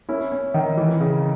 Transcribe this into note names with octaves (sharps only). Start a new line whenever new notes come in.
C#4 E4
C#4
D#3
E3
C#3